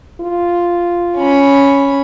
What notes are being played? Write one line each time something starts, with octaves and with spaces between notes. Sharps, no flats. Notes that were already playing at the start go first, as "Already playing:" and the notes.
F4
C#4 B5